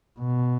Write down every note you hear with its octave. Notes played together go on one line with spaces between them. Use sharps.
B2